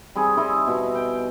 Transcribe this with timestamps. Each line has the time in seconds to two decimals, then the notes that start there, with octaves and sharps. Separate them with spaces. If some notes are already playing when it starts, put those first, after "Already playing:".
0.16 G3 C4 G#4
0.37 G3 E4 D#5
0.67 B2
0.95 G5